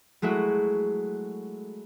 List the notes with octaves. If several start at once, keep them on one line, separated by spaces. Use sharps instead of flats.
F#3 G#3 A3 E4 F#4